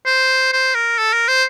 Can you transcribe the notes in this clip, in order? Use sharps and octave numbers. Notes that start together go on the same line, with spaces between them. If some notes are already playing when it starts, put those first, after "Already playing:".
C5
C5
A#4
A4
A#4
C5